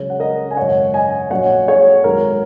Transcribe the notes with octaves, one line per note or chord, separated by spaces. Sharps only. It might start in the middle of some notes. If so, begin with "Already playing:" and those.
Already playing: C#2 C#3 F#3 G#4 C#5
F#5
A#4 D#5
G#5
G#1 F#2 C#3 C#5 F#5
D#5 G#5
A#1 A#2 F#3 C#5 F#5
G#4 C#5
G#1 G#2 F#3 A#4